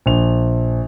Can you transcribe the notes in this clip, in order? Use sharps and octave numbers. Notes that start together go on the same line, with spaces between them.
A#1 F7